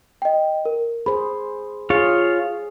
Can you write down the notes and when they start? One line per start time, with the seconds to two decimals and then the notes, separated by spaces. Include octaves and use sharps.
0.22 D#5 G5
0.65 A#4
1.06 G#4 C5 B5
1.90 F4 G#4 C#5 F5